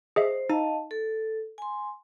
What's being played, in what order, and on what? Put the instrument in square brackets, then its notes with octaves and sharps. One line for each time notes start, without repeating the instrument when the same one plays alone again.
[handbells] G#4 D#5 E5 [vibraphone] C5
[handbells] D#4 [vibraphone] D#5 F5 A5
[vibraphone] A4
G#5 C6